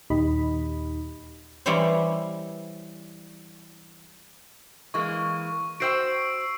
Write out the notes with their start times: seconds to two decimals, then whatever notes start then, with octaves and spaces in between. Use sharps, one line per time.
0.10 D#2 A#2 D#4 G4 D#5 B5
1.66 E3 G3 E4 C5 C#5
4.94 E3 G#3 A#3 C#6
5.80 F#4 C5 G5 E6 C7 D7